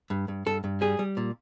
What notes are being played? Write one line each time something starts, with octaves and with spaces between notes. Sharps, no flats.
G2
G2
G2 A4
G2
G3 G#4
G3
A#2